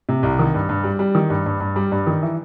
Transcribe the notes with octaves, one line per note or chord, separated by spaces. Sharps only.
C3
C2
D#3
G2
G2
G3
G3
D#3
G2
G2
G2
G3
G2
D#3
E3